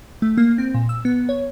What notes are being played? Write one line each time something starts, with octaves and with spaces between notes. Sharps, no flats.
A3
A#3
C4
A#2
E6
B3
C#5